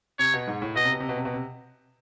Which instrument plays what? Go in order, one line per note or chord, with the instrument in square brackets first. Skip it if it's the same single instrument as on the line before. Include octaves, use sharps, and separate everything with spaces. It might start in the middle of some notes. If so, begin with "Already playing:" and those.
[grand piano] C3 [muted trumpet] C#5
[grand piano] B2
G#2
A2
[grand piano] B2 [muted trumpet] D#5
[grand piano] C3
B2
C3
B2
C3
B2
C3